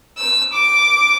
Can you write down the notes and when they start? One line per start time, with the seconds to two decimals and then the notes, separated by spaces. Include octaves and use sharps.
0.18 E6
0.53 D6